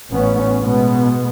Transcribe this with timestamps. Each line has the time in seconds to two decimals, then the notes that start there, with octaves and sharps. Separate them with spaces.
0.10 A1 B3 C#4
0.64 B2 G#3 B3